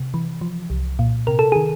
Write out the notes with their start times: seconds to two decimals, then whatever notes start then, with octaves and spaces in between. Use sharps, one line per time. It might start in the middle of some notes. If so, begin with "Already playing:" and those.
Already playing: C3
0.14 E3
0.41 F3
0.70 C2
0.99 A#2
1.27 C3 A#4
1.39 A4
1.52 D#3 G#4